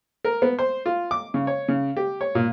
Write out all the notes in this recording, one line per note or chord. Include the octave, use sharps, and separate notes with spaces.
A#4
B3
C5
F4
D6
C#3
C#5
C#3
G4
C#5
A#2